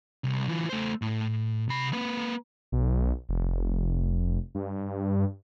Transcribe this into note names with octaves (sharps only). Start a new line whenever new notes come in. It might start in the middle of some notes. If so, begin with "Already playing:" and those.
C2
E3 F4
A3 C5
A2
C3 B5
A#3 B4
B1
F1
G2